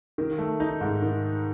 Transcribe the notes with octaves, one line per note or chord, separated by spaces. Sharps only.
D#3
A3
D#4
G#2
D#3